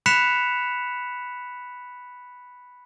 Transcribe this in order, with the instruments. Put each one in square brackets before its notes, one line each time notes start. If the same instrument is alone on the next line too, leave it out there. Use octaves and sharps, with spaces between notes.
[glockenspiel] B5 F#6 B6 C#7 E7 F7